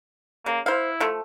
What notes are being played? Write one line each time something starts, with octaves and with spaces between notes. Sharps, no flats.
C#3 A#3
E4 C5 F5
F3 A3